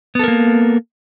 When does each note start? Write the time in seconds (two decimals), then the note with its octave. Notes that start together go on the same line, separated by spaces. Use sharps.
0.15 B3
0.19 A4
0.24 A#4
0.28 A#3